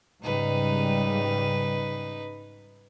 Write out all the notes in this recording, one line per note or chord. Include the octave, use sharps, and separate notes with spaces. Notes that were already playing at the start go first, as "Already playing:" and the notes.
G#2 C#3 G3 D#4 B4